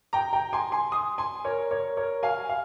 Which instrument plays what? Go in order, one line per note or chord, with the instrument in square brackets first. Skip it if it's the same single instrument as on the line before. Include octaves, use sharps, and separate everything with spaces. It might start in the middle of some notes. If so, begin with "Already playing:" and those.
[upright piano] G5 A#5
G5 A#5
G#5 C6
G#5 C6
C6 D#6
G#5 C6
A#4 C#5
A#4 C#5
A#4 C#5
F5 G#5
F5